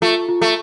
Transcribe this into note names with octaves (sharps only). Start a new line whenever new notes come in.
A3 F4
F4
A3